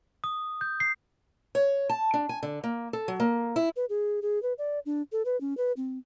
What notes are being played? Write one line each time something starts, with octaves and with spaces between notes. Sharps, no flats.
D#6
G6
C7
C#5
A5
D4
G#5
D3
A#3
A4
F#3
A#3
E4
B4
G#4
G#4
B4
D5
D4
A4
B4
C#4
B4
C4